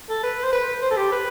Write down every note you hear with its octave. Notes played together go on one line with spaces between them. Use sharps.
A4
B4
C5
B4
C5
A4
G4
B4